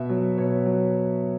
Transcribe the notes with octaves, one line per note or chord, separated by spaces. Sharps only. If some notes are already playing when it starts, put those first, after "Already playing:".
Already playing: B2 E5
F#3
B2 C#5
F#3